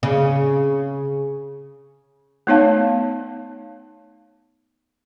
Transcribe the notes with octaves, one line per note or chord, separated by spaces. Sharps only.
C#3
A3 B3 D#4 C#5 F5 A5